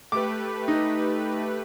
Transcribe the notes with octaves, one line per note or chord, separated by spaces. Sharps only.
A3 G4 B4 D6
D#4